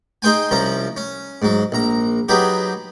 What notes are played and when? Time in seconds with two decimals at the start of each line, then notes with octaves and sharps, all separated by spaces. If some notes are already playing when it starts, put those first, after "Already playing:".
0.22 D#4 G#4 C5 G5 G#5
0.51 C2 F3 C#4 A#5
0.97 C#4
1.42 G#2 F#3
1.72 A#1 A#5
2.29 F#3 B3 D#4 G4 G#4